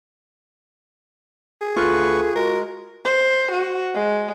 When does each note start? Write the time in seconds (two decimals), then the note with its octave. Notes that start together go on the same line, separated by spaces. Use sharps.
1.61 G#4
1.76 D2 F4 A4 B4 C#6
2.35 G#3 F#4 A#4
3.05 C5
3.52 F#4
3.95 G#3